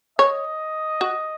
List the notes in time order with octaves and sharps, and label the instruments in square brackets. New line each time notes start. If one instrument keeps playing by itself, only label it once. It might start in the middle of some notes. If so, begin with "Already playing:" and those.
[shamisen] C#5 [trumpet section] D#5
[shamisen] F#4